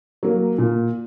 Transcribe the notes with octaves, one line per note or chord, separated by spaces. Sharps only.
F#3 A#3
A#2